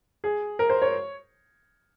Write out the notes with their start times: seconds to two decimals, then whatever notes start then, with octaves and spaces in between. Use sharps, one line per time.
0.24 G#4
0.59 A#4
0.70 C5
0.82 C#5